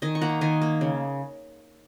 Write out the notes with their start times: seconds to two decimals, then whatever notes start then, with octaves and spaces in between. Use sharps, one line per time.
0.02 D#3 D#5 G#5
0.15 C#6
0.21 A#3 F#5 A#5
0.41 D#3 D#5 G#5
0.62 A#3
0.81 C#3